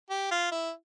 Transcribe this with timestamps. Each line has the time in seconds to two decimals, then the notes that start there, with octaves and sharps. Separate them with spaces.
0.10 G4
0.31 F4
0.52 E4